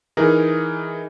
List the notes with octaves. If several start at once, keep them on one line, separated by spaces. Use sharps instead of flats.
E3 D#4 G#4 A#4